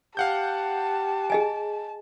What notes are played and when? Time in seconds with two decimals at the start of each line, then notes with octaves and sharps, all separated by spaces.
0.17 G4 F5 F#5 A5 G6
1.30 G#4 D#5 G#5